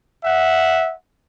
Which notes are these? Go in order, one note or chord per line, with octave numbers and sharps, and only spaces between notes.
E5 F#5